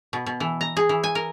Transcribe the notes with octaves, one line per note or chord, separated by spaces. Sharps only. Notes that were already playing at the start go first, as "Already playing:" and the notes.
B2
B2
E3
A#5
G#4
E3
G#5
A#4